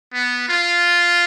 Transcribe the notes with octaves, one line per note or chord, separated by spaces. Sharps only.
B3
F4